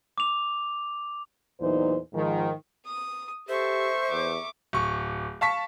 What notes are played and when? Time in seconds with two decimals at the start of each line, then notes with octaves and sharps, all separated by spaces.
0.18 D6 F7
1.60 E2 A#2 E3 F#3 D#4 C5
2.13 G#2 D#3 F3
2.86 D#6
3.49 G4 A4 C5 E5 C#6
4.11 E2 D6
4.73 D1 C#6
5.41 F5 A5 C#6 B6